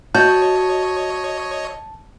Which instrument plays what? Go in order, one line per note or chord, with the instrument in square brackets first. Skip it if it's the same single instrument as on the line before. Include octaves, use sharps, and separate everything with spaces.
[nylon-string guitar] F#4 [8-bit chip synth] C#5 D#5 [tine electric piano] A5 [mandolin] G6